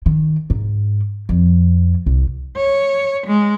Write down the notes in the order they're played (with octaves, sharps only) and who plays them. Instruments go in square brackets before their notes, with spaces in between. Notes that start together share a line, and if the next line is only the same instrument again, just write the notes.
[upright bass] D#3
G#2
F2
C2
[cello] C#5
G#3